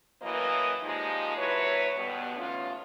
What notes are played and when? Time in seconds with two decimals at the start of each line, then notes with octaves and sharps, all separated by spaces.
0.22 F#2 A2 E3 A#3 B4 D#5
0.82 A#2 F3 G#3 D#4 G4 D#5
1.37 D#2 F#3 E4 B4 C#5
1.95 G2 B2 D3 G3 B3
2.36 E2 G#2 A3 C#4 F4